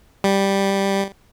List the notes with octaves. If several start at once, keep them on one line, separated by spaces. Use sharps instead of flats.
G3